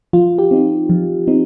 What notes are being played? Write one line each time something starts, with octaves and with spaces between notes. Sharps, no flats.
F3 F4
G4
C4 D#4
F3
C4 D#4